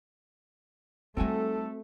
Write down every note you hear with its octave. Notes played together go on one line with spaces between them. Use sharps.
G3 A3 C4 D#4 F#4 A4 G#5